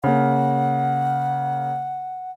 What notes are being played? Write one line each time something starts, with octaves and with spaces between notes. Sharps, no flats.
C#3 A#3 F#5